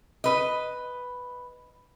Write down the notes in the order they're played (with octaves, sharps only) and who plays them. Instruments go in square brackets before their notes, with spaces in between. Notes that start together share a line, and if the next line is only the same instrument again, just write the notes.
[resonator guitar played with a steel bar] B4 D#5